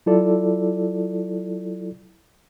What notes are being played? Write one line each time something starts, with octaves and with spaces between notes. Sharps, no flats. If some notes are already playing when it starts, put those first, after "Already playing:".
F#3 E4 F4 A4 D5